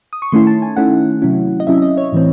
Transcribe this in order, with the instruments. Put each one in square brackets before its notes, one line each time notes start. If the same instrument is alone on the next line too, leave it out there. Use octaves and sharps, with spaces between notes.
[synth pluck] D#6
C#6
D#3 A3 C#4 E4 C6
A5
G#5
D#3 A3 C#4 E4 F#5
C3 F#3 C#4 E4
D#5
C3 F#3 C#4 E4 E5
D#5
C#5
A2 E3 C4